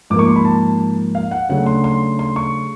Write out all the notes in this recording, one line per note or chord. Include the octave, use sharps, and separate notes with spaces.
G#2 F3 A#3 D6
C#6
C6
B5
A5
F5
F#5
C#3 F#3 A3 D4 F#5
C6
C6
C6
C#6